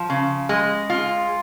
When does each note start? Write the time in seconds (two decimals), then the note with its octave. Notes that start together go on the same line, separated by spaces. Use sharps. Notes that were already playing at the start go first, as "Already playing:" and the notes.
Already playing: F3
0.10 C#3
0.49 G#3
0.90 F4